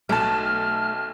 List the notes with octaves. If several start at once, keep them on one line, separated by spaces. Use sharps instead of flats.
B1 A3 A5 F6